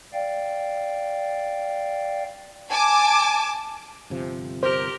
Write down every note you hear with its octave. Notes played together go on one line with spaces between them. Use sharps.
D5 F5 G5
G#5 A5 D6
G1 C3 F3
G4 A#4 C5